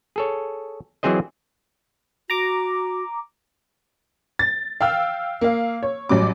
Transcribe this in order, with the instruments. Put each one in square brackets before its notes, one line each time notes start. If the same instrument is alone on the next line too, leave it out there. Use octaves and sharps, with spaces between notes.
[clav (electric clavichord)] G#4 A4 C#5
E3 F#3 C4 G#4 C5 D#5
[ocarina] F#4 [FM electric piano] A#5 D6
[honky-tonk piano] A6
F5 G5 E6 F6
A#3 F5
C#5
A1 F#3 G3 D6